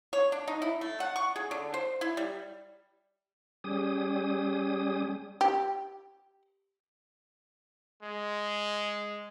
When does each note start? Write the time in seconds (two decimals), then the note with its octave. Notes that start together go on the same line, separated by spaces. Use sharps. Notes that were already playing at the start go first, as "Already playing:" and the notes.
0.13 C#5
0.32 D4
0.48 D#4
0.62 E4
0.81 A3
1.00 F#5
1.16 C#6
1.36 G#4
1.51 D3
1.74 C5
2.01 E4
2.17 G3
3.64 G3 C#4 G4 G#4 D#6
5.41 G4
8.03 G#3